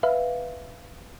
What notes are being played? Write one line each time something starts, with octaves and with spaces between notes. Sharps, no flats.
B4 E5 F5